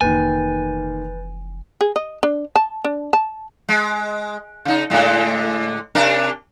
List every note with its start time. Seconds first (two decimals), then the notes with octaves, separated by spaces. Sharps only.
0.01 F1 A#2 D#3 E3 B4 G#5 G6 A6
1.81 G#4
1.96 D#5
2.23 D4
2.56 A5
2.84 D4
3.13 A5
3.69 G#3
4.65 C#3 D#4
4.90 A2 D3 G#3
5.95 C3 D4 A#4